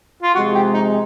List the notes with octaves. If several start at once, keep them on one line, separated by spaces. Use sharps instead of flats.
F4
C3 F3 G#3 F#4
G4
D#4